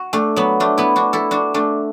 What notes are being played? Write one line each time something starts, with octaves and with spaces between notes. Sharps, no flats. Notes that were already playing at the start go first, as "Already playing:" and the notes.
Already playing: F#4
A3 D4
F#3 B3
A3 D4
B3 E4
D4 F#4
E4 A4
D4 F#4
A3 D4